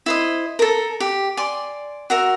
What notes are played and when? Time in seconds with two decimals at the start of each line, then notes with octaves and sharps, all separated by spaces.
0.06 E4 C5 D#5
0.59 A4 A#4
1.00 G4
1.37 D5 G#5 C6
2.10 F#4 A#4 E5